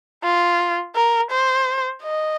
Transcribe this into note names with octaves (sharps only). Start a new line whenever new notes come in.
F4
A#4
C5
D#5